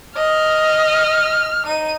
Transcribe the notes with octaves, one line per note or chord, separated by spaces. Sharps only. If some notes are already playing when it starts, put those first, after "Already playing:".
D#5 F6
D#4 D#7